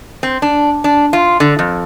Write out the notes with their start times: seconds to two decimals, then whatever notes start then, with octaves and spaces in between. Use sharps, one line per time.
0.23 C4
0.42 D4
0.84 D4
1.13 F4
1.40 D3
1.59 F2